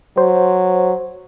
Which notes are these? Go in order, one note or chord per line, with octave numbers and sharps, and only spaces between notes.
F#3 C5